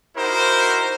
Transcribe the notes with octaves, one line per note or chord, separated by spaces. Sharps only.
D#4 E4 F#4 A#4 C5